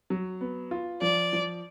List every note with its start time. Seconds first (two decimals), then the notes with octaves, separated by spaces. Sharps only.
0.10 F#3
0.41 B3
0.71 F4
1.02 F3 D5
1.33 F3